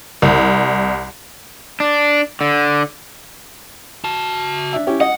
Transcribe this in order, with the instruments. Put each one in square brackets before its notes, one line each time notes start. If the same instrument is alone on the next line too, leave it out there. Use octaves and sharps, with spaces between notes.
[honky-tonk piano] C2
[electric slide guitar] D4
D3
[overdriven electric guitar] F#4 A5
[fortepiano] D4 E5
C#4 E4 G4
[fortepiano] D#5 [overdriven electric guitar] F#5